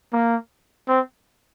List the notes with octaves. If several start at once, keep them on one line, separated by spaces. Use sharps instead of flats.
A#3
C4